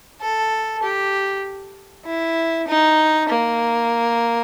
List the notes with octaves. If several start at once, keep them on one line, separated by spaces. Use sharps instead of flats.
A4
G4
E4
D#4
A#3